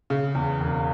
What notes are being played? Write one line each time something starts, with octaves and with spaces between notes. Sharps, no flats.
C#3
E2
E1